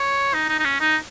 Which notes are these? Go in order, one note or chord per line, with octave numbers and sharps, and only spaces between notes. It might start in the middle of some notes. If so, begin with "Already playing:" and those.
Already playing: C#5
D#4
D#4
D#4
C#4
D#4